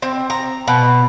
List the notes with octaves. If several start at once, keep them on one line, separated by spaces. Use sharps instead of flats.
C4
A#5
B2